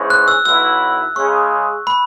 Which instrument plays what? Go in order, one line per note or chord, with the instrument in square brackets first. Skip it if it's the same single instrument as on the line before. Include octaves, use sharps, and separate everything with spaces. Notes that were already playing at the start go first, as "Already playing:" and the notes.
Already playing: [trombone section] G#2 E3 G#3 C#4
[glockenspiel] F#6
E6
[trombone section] B1 B2 F#3 E4 [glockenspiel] E6
[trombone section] C#3 G#3 C#4 G#4 [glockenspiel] C#6
[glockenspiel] B5